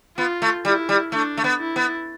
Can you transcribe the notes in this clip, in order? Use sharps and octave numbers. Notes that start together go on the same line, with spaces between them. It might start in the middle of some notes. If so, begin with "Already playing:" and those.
B3 F4
A3
G3 E4
G3
A3 D4
A3
B3
E4
B3